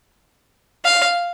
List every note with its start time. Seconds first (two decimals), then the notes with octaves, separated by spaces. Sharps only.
0.85 F5